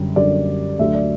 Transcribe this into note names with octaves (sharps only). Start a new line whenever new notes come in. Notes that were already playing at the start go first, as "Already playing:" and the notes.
Already playing: F#2 D3 G3
F#2 D3 G3 D5
D2 D3 F#3 E5
D5